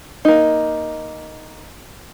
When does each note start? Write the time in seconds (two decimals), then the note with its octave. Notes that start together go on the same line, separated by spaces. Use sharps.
0.25 A#3 D#4